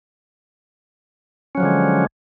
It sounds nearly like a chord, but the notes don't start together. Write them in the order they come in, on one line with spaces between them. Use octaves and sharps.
C#4 F#3 F3 D3 G#3